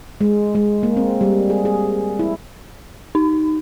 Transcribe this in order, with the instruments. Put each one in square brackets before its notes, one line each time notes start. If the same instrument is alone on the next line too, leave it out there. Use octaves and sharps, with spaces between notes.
[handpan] G#3
G#3
A#3
C4
G3
G#4
G#4
E4
[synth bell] D#4